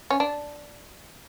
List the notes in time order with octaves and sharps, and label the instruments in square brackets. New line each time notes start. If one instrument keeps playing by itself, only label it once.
[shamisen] C#4
D4